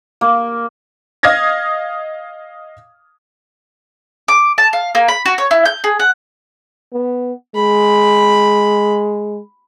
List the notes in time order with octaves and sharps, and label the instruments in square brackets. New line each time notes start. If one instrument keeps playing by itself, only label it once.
[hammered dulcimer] A#3
[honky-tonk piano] D#5 F5 D#6 F6 G#6 A#6
[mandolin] D6
A5
F5
A#3
B5
F#4
C#5
E4
G6
G#4
F#5
[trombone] B3
[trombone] G#3 [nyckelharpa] B5